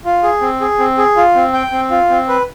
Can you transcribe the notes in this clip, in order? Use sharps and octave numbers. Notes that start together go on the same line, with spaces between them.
F4
G#4
C4
G#4
C4
G#4
F4
C4
G5
C4
F4
C4
B4